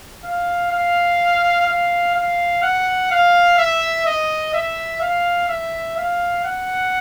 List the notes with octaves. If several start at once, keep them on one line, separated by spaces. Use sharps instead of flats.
F5
F5
F5
F5
F#5
F5
E5
D#5
E5
F5
E5
F5
F#5